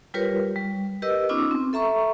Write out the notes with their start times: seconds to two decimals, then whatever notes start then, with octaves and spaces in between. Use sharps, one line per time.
0.14 G3 F4 G4 A#4 B4 C#5
0.56 G3
1.02 G4 A#4 B4 D#5 E6
1.29 B3 C#4 D#4 F4 D6 E6
1.51 C4
1.73 A4 E5 A#5 C#6